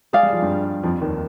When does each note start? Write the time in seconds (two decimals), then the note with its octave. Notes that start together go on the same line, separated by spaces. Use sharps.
0.13 G#3 G#4 D5 F5
0.23 G3
0.33 F3
0.42 G2 G3
0.83 F2 F3
1.01 D#2 D#3